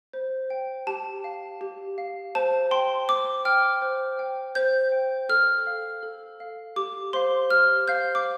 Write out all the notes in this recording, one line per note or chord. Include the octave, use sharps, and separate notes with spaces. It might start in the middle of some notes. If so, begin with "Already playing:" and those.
C5
G5
G4 A5
F5
G4
F5
C5 A5
G5 C6
C5 D6
G5 F6
C5
G5
C5 G6
G5
A4 F6
F5
A4
F5
G4 D6
C5 F5 C6
G4 F6
C5 F5 G6
D6